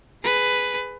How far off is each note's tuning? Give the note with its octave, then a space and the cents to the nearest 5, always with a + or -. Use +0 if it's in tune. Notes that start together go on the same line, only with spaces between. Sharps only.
G#4 +0 B4 +10